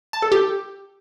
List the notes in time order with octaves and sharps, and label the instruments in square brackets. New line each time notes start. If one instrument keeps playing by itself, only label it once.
[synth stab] A5
A4
G4